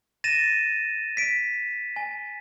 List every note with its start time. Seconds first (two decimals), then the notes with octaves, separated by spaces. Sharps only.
0.24 A6 A#6 D#7 E7
1.17 B6 D7
1.96 G#5